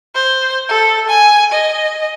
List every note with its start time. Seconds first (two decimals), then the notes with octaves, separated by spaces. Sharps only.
0.15 C5
0.69 A4
1.09 G#5
1.52 D#5